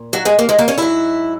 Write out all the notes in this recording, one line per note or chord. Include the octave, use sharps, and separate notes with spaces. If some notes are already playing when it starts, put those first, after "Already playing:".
Already playing: A#2
F#3 F#4
G#3 G#4
A#3 A#4
G#3 G#4
A#3 A#4
C#4 C#5
G#2 F#3 E4 E5